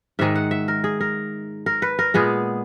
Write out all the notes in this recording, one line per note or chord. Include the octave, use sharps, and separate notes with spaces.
G#2 D#3 G#3 E5
F#5
E5
A#4
G#4
A#4
A#4
B4
A#4
A#2 G#3 B3 G#4